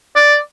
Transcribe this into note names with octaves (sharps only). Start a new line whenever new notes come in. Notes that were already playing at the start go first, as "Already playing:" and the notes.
D5